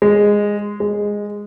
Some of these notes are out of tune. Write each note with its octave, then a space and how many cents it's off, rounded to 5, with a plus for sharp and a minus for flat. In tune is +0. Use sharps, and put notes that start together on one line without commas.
G#3 -10
G#3 -10